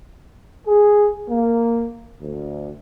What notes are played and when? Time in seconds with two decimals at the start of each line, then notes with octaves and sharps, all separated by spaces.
0.67 G#4
1.29 A#3
2.21 D2